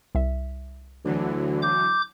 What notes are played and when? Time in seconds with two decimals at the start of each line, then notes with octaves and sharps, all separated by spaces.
0.15 C2 E5
1.05 D2 D3 E3 F#3
1.63 D6 G6